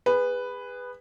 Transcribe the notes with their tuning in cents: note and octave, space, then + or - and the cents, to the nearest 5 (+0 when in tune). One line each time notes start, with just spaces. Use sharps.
G#4 -30 B4 +5